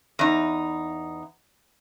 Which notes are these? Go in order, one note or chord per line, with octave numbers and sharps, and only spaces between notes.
E2 D#4